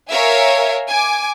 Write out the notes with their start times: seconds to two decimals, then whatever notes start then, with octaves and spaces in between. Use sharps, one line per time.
0.11 A#4 C#5 E5 F5 G#5
0.88 G#5 D6